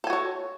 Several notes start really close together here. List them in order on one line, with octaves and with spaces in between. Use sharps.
A4 G#5 F#4 C#5